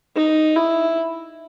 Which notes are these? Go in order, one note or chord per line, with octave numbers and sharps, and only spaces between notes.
D#4
E4